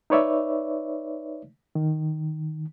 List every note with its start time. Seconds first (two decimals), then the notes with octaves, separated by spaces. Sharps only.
0.10 D#4 B4 C#5 D5 E5
1.75 D#3